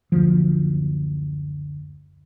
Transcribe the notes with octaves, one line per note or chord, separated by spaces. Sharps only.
F#1 D2 F3